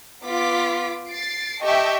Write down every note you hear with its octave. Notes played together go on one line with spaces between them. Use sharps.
B3 F4 D6 B6
A6 C7 D7
G4 D#5 E5 G5 A5 C#6